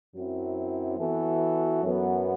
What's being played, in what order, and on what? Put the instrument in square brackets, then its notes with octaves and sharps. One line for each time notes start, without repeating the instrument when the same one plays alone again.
[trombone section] F#2 F#3 C4 E4
E3 B3 F#4 A4
F#2 F#3 B3